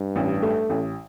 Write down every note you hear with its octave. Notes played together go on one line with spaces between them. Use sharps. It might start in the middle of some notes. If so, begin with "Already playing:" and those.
Already playing: G2
A1
A3
A1